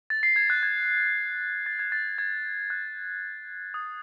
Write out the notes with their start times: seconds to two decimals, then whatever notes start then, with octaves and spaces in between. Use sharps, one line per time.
0.10 A6
0.23 C7
0.36 G#6
0.50 F#6
0.63 G#6
1.66 A6
1.79 G#6
1.92 A6
2.18 G#6
2.70 F#6
3.74 D#6